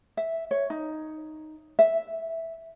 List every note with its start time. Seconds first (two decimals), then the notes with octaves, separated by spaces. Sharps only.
0.17 E5
0.51 C#5
0.70 D#4
1.79 E5